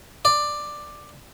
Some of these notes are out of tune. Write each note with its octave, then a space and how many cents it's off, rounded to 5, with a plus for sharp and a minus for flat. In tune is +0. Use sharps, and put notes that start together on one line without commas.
D5 +10